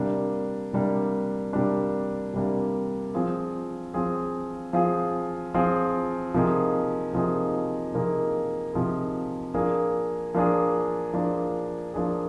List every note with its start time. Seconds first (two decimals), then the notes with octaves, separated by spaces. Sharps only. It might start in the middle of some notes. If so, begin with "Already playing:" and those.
Already playing: C3 G3 A#3 D4
0.73 C3 G3 A#3 D4
1.53 C3 G3 A#3 D4
2.33 C3 G3 A#3 D4
3.14 F3 C4 F4 G#4
3.94 F3 C4 F4 G#4
4.73 F3 C4 F4 G#4
5.54 F3 C4 F4 G#4
6.34 C3 F3 A#3 D#4 G#4
7.13 C3 F3 A#3 D#4 G#4
7.94 C3 F3 A#3 D#4 G#4
8.74 C3 F3 A#3 D#4 G#4
9.54 F3 A#3 D4 G#4
10.34 F3 A#3 D4 G#4
11.13 F3 A#3 D4 G#4
11.94 F3 A#3 D4 G#4